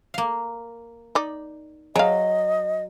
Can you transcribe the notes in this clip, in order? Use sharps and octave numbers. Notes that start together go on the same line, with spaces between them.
A#3 F5
D#4 D5
F#3 G#4 D#5 F5